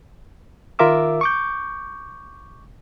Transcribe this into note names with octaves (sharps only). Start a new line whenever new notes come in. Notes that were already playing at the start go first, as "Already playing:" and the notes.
D#3 F4 A#4 E5 D6 E6
C#6 D6 G6